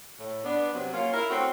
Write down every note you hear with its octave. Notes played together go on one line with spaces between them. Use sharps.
A2
B3 D4
C3 F#3
A#3 C#4 F4
E4 A#4
A3 C4 C#4 E4 F#4